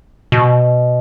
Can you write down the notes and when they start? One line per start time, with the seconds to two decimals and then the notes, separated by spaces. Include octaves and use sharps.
0.32 B2